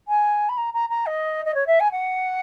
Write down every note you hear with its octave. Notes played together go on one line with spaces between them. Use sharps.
G#5
B5
A#5
A#5
A#5
D#5
D#5
C#5
E5
G#5
F#5